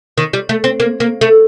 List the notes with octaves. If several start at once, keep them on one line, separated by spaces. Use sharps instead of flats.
D#3
G3
A3
C4
A#3
A#3
A3